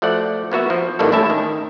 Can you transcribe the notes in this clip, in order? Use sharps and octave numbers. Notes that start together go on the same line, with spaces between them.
F3 A3 F#4 D5 F#5
A#3 B3 F#4 E5
F3
G#1 D#3 E3 G3 A#3 A4
A1 A2 C#4 E4 E5 A5
D#3